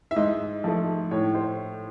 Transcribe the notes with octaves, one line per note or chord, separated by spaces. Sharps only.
E5
G#2 D#5
F3 A3
A2 C#5
C5